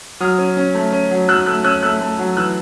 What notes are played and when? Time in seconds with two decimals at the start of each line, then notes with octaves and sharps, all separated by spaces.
0.20 F#3 D#6 F6
0.38 C#4
0.57 C#4
0.75 A3
0.93 C#4
1.11 F#3
1.28 F#3 E6 F#6
1.46 A3 E6 F#6
1.64 C#4 E6 F#6
1.83 A3 E6 F#6
2.01 A3
2.19 F#3
2.37 E3 E6 F#6